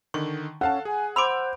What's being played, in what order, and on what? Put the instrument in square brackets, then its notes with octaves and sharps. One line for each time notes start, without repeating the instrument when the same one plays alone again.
[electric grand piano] D3 D#3 [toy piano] C#6
[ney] C#4 [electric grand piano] A4 F5 A5 [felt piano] F#5
[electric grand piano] G#4 [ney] G#5
[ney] C5 [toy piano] B5 C6 D6 [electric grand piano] E6 D7